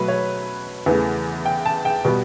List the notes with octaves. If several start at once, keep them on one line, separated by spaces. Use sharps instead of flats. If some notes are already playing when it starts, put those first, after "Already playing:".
Already playing: B2 F#3 A3 B4
C#5
E2 C#3 E3 A3
G5
A5
G5
B2 G3 B3